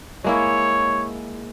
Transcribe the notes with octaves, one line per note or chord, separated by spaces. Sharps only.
G#3 A#3 E4 C#5